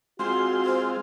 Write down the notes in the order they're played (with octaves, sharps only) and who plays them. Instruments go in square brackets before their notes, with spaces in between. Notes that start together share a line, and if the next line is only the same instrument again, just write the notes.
[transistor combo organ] G#3 C4 F4 [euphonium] F#4 [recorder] C6
[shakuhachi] C5